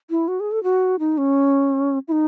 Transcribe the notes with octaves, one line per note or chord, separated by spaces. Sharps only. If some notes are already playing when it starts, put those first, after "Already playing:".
E4
F#4
G#4
A4
F#4
D#4
C#4
E4
D#4